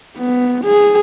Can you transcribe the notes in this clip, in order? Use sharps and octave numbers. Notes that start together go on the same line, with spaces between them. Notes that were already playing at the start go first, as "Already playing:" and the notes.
B3
G#4